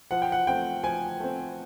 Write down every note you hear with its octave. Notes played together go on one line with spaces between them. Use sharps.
F3 F#5
G5
F#5
A3 C4 G5
F3 G#5
A3 C4